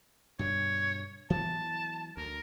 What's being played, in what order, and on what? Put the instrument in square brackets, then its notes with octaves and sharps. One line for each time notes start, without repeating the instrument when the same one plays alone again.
[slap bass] G2 B2 D3 [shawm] C#5
[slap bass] E3 F#3 B3 [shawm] A5
[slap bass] D2 [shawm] A#4